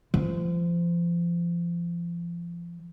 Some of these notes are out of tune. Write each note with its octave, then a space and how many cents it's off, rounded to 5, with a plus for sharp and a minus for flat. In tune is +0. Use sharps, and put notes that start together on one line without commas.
F3 -30